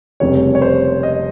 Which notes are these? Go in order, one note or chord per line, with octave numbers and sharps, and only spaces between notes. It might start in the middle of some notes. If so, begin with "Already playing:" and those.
F1 F2 C#3 G3 C#5
C#5
C5
D#5